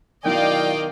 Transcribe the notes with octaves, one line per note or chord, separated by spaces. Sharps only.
B2 D#3 F#3 E4 D5 D#5 F5 G5